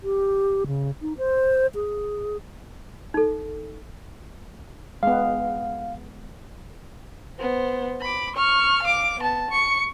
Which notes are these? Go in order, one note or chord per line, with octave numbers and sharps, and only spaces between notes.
G4
C#3
D#4
C5
G#4
D#4 A4
G#3 B3 F5
B3 C5
B5 D6
C#6 F6
F5 D6
B3 A5
C#6 C#7